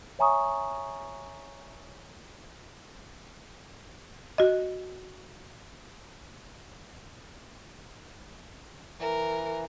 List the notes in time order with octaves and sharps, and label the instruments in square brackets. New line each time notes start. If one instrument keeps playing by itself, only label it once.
[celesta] C#5 E5 G#5 A#5 C#6 D#6
[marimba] F#4 D#5
[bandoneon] E3 [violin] A#4